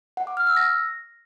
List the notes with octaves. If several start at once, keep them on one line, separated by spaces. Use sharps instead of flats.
F#5
D6
F6
E6
A#6